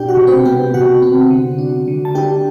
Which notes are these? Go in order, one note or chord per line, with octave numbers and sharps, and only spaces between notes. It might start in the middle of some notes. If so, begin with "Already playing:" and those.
Already playing: B2 D4 G4 G5
F#4 F#5
C3
C4 C5
B3 G4 G5
C3 F#4 F#5
C4
D3
D4
D3
A5
D4 G4 G5